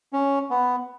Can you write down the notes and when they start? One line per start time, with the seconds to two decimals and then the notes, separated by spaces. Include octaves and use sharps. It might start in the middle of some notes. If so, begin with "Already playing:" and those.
0.13 C#4
0.50 B3